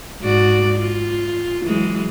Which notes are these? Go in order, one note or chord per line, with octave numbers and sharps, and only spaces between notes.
G#2 F#4 D5
F4
E3 F#3 G#3